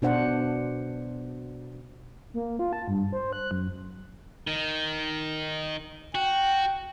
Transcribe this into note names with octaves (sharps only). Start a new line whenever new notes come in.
B2 D4 C5 F#5
A#3
F4
A5
G2
C5
F#6
F#2
D#3
F#4 G5